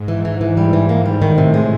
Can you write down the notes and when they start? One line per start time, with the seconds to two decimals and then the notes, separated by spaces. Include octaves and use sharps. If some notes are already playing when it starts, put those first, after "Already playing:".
Already playing: G#2
0.08 E3
0.25 E3
0.41 E3
0.57 G3
0.73 E3
0.89 A#3
1.06 G3
1.22 A2 D#3
1.38 C3
1.54 G#3